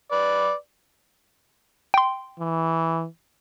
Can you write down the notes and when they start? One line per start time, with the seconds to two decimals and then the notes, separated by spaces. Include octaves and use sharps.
0.12 B4 D5
1.94 G5 C6
2.40 E3